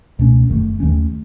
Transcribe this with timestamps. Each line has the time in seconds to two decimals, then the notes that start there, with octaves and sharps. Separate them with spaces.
0.19 C#2 B2 A3 C#4
0.49 F#1 F#2 D#3 A3
0.80 D#2 D#3 A3 C#4